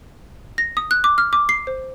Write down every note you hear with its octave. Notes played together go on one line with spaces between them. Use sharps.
A#6
D#6
F#6
D6
F6
D6
C7
C5